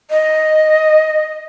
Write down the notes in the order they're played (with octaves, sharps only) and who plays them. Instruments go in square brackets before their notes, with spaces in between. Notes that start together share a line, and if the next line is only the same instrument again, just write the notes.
[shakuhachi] D#5